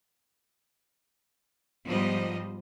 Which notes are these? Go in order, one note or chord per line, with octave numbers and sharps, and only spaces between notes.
G#2 F3 G3 B3 C5 D#5